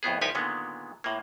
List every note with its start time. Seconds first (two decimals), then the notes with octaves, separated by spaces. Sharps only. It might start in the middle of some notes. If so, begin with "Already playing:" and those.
0.03 F2 A2 B3 G#4
0.21 C2 F3 D#4 G4 B4 G#5
0.35 A#2 D3 D#3 G#3 B3
1.04 A2 A#3